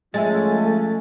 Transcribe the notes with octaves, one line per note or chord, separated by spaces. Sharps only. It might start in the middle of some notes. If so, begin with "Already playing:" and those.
F3 G#3 A3 C#4 F4 E5 G#5 A6